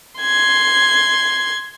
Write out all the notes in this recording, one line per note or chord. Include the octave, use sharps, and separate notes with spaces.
C6 G#6